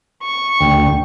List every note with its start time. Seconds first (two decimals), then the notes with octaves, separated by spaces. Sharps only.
0.21 C#6
0.61 D2 G5